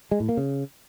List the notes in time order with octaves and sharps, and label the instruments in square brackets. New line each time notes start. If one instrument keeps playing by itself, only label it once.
[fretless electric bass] G#3
A2
A#3
C#3